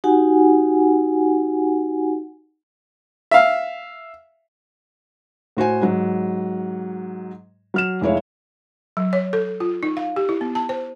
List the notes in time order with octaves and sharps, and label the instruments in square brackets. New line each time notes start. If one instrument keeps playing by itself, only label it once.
[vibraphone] D#4 F#4 G4 F#5 G#5
[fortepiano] E5 F5
[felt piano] A2 F#4 C5 G#5
G#2 F#3
F#3 F6 E7
F1 G#3 E4 C#5 F5
[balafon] F#3
C#5
A4
F4
D#4
F5
G4
E4
B3
A5
C5